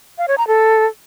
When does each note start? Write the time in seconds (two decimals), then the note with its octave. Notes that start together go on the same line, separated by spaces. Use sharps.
0.18 F5
0.28 C#5
0.38 A#5
0.48 A4